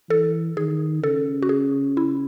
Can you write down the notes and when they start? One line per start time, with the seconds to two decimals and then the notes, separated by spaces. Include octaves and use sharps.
0.10 E3 A4
0.57 D#3 G#4
1.03 C#3 A4
1.42 F#4
1.49 G#4
1.97 E4